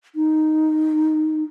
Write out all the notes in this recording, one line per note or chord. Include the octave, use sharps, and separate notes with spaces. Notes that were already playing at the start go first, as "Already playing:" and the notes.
D#4